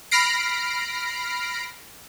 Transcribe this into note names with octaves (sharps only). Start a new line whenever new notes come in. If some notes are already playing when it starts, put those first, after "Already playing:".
B5 F6 A#6 C7 D7